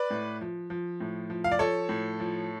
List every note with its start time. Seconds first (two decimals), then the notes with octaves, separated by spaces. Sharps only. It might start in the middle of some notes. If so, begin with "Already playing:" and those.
Already playing: B4 D5
0.11 A2
0.41 F3
0.70 F3
1.01 A2
1.30 F3
1.44 F5
1.52 D5
1.59 F3 A4 C#5
1.89 A2
2.20 F3